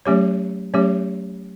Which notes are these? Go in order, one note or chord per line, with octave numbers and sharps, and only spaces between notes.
F#3 A3 C#4 G4 C#5
F#3 A3 C#4 G4 C#5